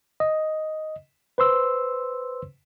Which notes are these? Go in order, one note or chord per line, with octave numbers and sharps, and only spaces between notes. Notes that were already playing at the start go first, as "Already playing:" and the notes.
D#5
B4 C5 C6 E6